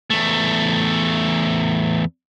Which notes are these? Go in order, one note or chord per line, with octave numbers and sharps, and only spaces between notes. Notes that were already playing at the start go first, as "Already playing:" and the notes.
E2 A3